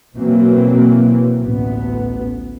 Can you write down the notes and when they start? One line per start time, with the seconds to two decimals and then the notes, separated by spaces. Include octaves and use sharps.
0.16 B2 E3 F#3 A#3 C4
1.39 A1 D2 B3